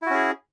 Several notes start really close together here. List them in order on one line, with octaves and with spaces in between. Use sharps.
E4 F#4 C#4 G#4